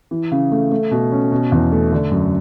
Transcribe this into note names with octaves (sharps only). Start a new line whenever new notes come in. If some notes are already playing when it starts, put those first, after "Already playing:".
E3
C#3
A3
A3
B2
C#4
B2
E2
A3
D3
F#2